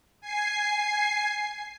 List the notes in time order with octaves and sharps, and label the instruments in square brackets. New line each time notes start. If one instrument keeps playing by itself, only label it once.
[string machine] G#5 C7